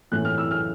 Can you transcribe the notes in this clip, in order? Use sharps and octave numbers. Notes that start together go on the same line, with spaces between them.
A2 E3 A3 C#4 E4 F#6
F6
E6
F6